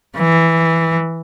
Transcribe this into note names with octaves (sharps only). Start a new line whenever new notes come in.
E3